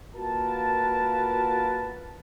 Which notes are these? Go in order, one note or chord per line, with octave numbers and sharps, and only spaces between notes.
A#3 F4 F#4 A#4 B4 A5